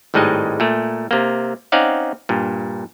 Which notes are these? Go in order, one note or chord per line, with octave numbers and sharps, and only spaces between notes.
G#1 A2 G3 G#3 D#4 D#5
A#2 A3
C3 A#3
C4 C#4 D#4 D5 F5 F#5
G2 A#2